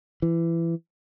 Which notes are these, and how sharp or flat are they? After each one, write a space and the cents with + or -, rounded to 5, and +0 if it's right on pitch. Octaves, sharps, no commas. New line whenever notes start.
E3 +20